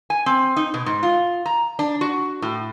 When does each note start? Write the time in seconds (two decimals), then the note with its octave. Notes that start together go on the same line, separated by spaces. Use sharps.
0.10 G#5
0.26 C4
0.56 D#4
0.74 B2
0.86 G#2
1.03 F4
1.46 A#5
1.79 D4
2.01 F#4
2.42 A2